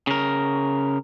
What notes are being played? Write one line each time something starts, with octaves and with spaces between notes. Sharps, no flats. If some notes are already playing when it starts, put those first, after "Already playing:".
C#3 A#4